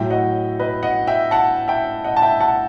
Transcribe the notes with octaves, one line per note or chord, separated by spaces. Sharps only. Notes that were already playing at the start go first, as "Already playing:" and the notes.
Already playing: A2 F#3 E5 G5
D#5 F#5
B4 D#5
D#5 F#5
E5 G5
F#5 A5
E5 G5
D#5 F#5
A5
E5 G5
F#5 A5